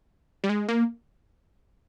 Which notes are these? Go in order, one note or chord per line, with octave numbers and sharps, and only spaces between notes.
G3
G#3
A#3